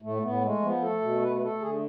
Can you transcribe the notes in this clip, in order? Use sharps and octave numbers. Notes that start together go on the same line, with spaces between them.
A2 A3
A2 B3
G#3 A3
F3 B3
A3 A4
B2
A3 B4
B4
A3 A4
D3 G#4